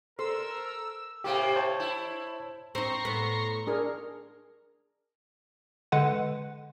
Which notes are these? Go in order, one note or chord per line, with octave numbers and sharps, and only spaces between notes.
A4 A#4 C5 E6
A2 C3 A#3 G4
C5 C#5 A5
E4
C4 D#4 A#5 C6 C#6
A2 B3
D4 G#4 A#4
D3 G#3 B4 F#5